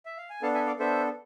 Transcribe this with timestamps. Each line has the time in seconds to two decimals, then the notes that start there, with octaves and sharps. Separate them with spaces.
0.06 E5
0.18 F5
0.30 G#5
0.42 B3 D4 A4 F5 A5
0.54 E5 G#5
0.66 D5 F5
0.79 B3 D4 A4 C5 E5